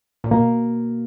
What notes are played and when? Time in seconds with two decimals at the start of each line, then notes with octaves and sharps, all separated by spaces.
0.24 A#2
0.31 B2 A#3